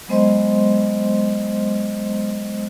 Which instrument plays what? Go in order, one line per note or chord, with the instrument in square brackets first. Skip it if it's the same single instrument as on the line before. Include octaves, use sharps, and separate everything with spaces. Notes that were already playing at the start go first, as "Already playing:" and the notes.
[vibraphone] F#3 G#3 B3 C5 D#5 C6